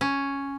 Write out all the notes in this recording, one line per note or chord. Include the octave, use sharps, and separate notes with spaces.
C#4